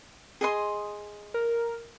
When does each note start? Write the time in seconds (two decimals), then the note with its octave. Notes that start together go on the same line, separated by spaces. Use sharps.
0.41 G#4 D#5 C6
1.34 A#4